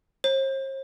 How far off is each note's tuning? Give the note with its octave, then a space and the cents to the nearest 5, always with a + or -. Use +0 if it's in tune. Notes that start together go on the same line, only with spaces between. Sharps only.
C5 +45